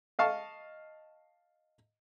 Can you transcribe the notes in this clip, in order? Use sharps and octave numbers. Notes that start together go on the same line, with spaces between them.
D#5 F5 A5 C#6